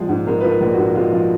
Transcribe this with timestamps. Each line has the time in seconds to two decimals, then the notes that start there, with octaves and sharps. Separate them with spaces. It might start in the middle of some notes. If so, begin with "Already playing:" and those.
Already playing: A#1 F3 G#3
0.09 G#2
0.27 G#3 A#4
0.41 F3 B4
0.49 A#4
0.61 A#1
0.72 F#4
0.79 G#2
0.95 G#3 F4
1.13 F3